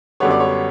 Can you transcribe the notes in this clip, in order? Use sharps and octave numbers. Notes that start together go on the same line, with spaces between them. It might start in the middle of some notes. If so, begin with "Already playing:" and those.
F#2 D3 G3 B3 C#5
D5
C#5